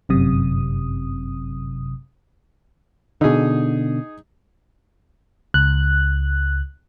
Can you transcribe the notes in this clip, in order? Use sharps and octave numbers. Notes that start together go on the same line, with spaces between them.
G1 F#2 C3 D#6
B2 D3 D#4 G#4
C#2 F#6